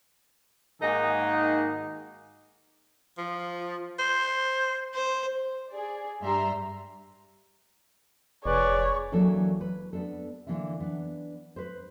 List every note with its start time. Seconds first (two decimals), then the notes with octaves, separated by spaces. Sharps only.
0.81 G#2 D#3 A#3 D#4 F#4 G#4
3.18 F3
3.99 C5
4.94 C5
5.69 G#4 D5
6.22 G2 G3 E5 A#5 C6
8.45 F1 G#4 B4 C#5 D5
9.12 E3 F#3 A#3 D4 A4
9.61 B4
9.93 B3 D4 A4
10.47 D3 E3 A#3 D4 E4
10.80 B3 D4
11.56 B4 C5